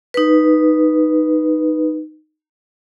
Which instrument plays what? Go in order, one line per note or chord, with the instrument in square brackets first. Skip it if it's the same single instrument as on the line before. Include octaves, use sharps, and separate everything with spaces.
[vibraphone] D#4 B4